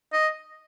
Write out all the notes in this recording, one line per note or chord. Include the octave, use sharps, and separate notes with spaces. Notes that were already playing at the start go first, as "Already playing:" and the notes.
D#5